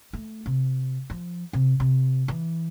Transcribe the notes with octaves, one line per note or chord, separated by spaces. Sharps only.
A3
C3
F3
C3
C3
E3